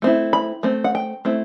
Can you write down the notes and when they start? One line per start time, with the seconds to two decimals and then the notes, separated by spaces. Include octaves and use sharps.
0.02 A3 C4 E4
0.33 B5
0.63 A3 C4
0.84 F#5
0.95 G5
1.25 A3 C4 E4